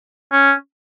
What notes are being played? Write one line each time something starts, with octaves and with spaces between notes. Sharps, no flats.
C#4